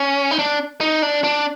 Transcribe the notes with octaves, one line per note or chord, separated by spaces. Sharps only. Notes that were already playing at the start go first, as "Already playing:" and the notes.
Already playing: C#4
D#4
D4
D#4
D4
D4